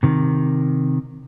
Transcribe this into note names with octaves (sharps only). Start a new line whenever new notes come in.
C3 D#3